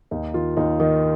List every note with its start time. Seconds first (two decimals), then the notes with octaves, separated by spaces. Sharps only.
0.11 D#2 D#4
0.34 D#3 F4
0.57 D#2 D#4
0.80 D#3 D#4